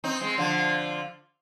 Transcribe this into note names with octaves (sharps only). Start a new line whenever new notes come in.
C4 D#4
G#3 C4
D3 F3